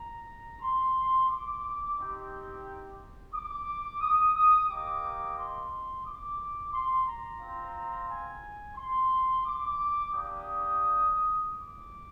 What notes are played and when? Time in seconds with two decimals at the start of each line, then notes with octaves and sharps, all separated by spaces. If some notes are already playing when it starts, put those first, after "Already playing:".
Already playing: A#5
0.61 C6
1.28 D6
1.97 C4 D#4 G4
3.33 D6
4.01 D#6
4.35 D#6
4.69 A#3 D#4 G4 D6
5.37 C6
6.05 D6
6.72 C6
7.06 A#5
7.40 C4 F4
8.08 G#5
8.76 C6
9.44 D6
10.12 A#3 D4 G4 D#6
11.47 D6